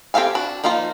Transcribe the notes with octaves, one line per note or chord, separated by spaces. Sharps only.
C4 G4 A4 F5 G#5
D4 F#4
F3 A#3 D#4 F4 A#5